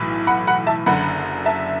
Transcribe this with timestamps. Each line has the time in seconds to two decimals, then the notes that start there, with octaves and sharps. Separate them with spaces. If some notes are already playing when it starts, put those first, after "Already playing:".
Already playing: B1 A2 E3
0.27 F#5 B5
0.47 F#5 B5
0.67 E5 A5
0.86 F#1 F#2 D3 F#5 B5
1.46 E5 A5